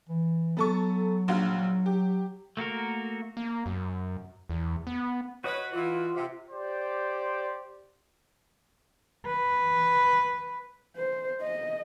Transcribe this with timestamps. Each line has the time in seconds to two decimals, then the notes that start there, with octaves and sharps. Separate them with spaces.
0.09 E3
0.57 F#3 B3 A4 C#6
1.28 A#1 F#4 F5
1.56 F#3
1.86 G4
2.57 A3 A#3 F#4 A#4
3.37 A#3
3.66 F#2
4.50 E2
4.87 B3
5.44 F#4 B4 C#5 D#5 F#5
5.72 E3 F4
6.15 C3
6.51 G4 C5 D5
9.26 B4
10.97 C5
11.41 D#5